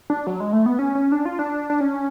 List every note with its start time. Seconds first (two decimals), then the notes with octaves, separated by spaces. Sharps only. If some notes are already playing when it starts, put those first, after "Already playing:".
0.10 D4
0.27 F#3
0.40 G#3
0.53 A3
0.66 B3
0.79 C#4
0.95 C#4
1.12 D4
1.25 F4
1.39 D4
1.70 D4
1.81 C#4